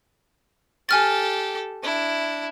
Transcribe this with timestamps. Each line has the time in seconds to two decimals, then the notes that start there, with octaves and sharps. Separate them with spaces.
0.89 G4 A4 G#5 F6 A6
1.83 D4 E4